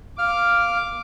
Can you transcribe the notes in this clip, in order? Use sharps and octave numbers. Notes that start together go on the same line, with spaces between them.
F5 D6 F6